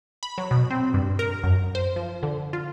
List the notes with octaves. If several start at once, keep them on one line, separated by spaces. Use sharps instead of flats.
B5
F#3
B2
C4
G2
A#4
F#2
C5
F3
D3
F4